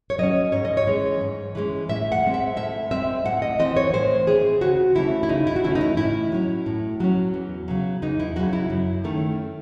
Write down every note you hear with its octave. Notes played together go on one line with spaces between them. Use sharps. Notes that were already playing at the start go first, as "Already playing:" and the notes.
C#5
F#3 C#4 D#5
G#2 C#5
D#5
C#5
E3 G#3 C#4
G#2
E3 G#3 C#4
A2 E5
F#5
G#3 C4
E5
A2 E5
G#3 C4 E5
A2 F#5
D#5
E3 C4 D#5
C#5
A2 C5
E3 C4 G#4
C#3 F#4
E3 A3 C#4 E4
E4
C#3 D#4
E4
F#4
E3 A3 C#4 E4
D#4
E4
A2 E4
F#3 C#4
A2
F#3 C#4
E2
C#3 F#3
E2 D#4
E4
C#3 F#3 F#4
E4
F#2
D#3 A3 C#4